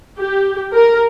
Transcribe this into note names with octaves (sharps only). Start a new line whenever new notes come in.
G4
A#4